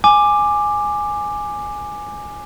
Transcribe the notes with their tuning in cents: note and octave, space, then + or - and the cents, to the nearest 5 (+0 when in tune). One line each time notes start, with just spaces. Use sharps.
G#5 +0 D6 +15